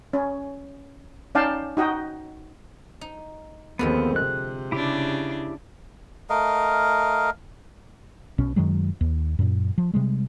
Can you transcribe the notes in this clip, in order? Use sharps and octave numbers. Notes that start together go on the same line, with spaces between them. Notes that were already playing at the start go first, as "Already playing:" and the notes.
C#4
C#4 D#4 D5 F5 G5 A5
D#4 F#4 D#5 G5
D#4
D#2 D3 F3 G#3 B3 C4
C3 F#6
C#3 D4 E4 G4
A3 A#4 D#5 F5
B1 B2 C#4
F#2 D#3 F#3 G#3
D#2
F#2 A#2
F3
C3 G3 G#3